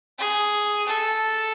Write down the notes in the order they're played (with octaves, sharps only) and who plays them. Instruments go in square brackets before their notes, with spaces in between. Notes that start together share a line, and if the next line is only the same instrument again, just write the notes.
[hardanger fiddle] G#4
A4